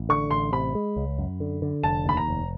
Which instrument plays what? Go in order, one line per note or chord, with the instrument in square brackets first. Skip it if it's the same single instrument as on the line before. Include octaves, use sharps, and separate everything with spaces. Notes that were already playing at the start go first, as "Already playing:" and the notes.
Already playing: [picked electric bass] A1
[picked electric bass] D3 [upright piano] C#6
[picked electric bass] A1 [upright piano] C6
[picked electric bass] C3 [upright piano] B5
[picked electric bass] G#3
C#2
F#2
D3
D3
[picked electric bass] F1 [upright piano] A5
[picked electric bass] D#2 [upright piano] B5
[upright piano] A#5
[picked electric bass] F1